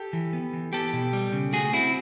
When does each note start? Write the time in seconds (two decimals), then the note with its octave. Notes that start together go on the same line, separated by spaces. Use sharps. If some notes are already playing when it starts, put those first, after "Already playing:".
Already playing: G4 A4
0.13 E3
0.33 B3
0.53 E3
0.73 B3 G4 A4
0.93 B2
1.13 G3
1.32 C#3
1.53 A3 F#4 G#4
1.73 C4 E4 F#4